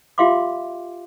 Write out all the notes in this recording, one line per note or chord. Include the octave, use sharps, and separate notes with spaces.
F4 G4 E5 F5 C6 D6